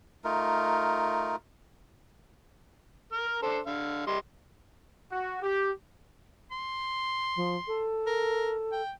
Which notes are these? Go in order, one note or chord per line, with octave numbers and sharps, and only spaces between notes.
A3 D#4 F4 A#4
A#4 F6
D4 A4 C5
D3 F5
G3 D#5 C6
F#4
G4
C6
F3
A4
A#4
G5